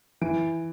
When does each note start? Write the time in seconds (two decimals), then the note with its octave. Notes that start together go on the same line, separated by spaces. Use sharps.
0.21 E3 D7